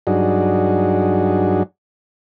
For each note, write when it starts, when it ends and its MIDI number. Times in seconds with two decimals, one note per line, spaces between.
0.07 1.63 43
0.07 1.63 54
0.07 1.63 62
0.07 1.63 63
0.07 1.63 66
0.07 1.63 68